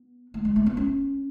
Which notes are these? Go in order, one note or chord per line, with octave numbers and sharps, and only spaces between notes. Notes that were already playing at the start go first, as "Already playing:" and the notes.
Already playing: B3
A3
G#3
A3
B3
C#4